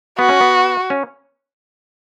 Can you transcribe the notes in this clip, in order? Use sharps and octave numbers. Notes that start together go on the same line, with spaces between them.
B3 F#4
C#4
B3
C#4